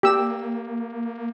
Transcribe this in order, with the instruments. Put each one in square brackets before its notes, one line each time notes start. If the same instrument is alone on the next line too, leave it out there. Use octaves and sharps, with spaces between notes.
[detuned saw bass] A#3 [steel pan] G4 E6